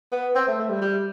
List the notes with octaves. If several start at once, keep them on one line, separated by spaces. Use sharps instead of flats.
B3
C4
A3
A3
G3
G3